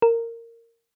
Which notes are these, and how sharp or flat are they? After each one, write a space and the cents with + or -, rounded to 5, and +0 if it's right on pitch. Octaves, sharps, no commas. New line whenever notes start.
A#4 -15